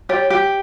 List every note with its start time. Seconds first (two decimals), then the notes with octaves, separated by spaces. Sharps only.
0.09 G4 C#5
0.30 G4